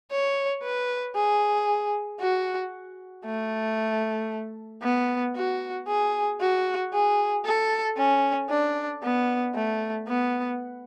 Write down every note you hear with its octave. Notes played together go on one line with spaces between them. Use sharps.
C#5
B4
G#4
F#4
A3
B3
F#4
G#4
F#4
G#4
A4
C#4
D4
B3
A3
B3